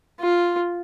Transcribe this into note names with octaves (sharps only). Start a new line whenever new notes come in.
F4